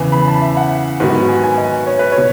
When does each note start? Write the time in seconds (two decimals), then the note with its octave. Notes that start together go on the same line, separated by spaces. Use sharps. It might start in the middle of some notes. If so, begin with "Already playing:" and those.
Already playing: E2 C#3 E3
0.12 B5
0.28 A5
0.42 E5
0.57 F#5
1.00 G#2 D#3 F#3 B3 F#4
1.28 G#5
1.43 G#5
1.57 D#5
1.87 C#5
1.99 B4
2.12 C#5
2.17 B2